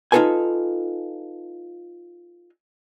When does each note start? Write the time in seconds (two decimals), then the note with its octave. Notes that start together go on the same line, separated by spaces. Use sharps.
0.12 D#4 F4 F#4 A4 B4 G#5